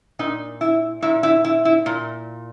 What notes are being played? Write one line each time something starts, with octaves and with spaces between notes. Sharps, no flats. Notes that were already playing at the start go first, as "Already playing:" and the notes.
A#2 D#4
E4
A#2 E4
E4
E4
E4
A#2